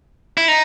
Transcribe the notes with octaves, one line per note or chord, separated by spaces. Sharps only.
E4
D#4